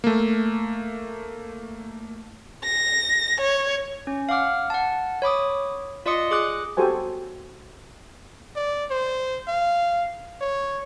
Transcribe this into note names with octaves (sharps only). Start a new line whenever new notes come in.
A3 A#3
A#6
C#5
C#4
F5 F#5 D6 F6
F#5 A5
C#5 B5 D6 D#6
F4 D5 D#5 C6 D#6 C#7
G#4 D6 D#6 F#6
F#4 G4 A4 C5 G#5
D5
C5
F5
C#5